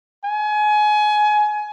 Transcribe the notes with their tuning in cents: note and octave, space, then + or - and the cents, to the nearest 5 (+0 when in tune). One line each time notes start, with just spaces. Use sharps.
G#5 +25